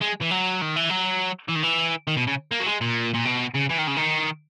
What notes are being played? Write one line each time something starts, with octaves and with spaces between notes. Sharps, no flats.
G#3
E3
F#3
D#3
E3
F#3
E3
D#3
E3
D#3
B2
C#3
A#3
F#3
G#3
A#2
A#2
B2
C#3
E3
D#3
C#3
D#3